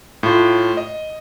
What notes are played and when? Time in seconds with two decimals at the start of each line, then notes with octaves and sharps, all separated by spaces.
0.23 A2 F4
0.77 D#5